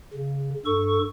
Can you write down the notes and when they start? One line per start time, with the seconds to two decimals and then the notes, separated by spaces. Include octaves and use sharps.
0.14 C#3
0.65 G2 A4 C#6